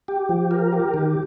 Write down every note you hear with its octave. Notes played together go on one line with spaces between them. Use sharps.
G4
F3
A#4
G4
D#3